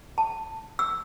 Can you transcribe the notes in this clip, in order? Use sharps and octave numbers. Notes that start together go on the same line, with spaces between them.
A5
E6